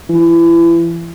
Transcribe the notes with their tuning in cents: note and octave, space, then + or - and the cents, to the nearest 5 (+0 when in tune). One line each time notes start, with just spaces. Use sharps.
E3 +30